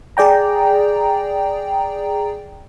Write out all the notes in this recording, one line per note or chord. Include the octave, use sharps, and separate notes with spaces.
G#4 D5 G5 A#5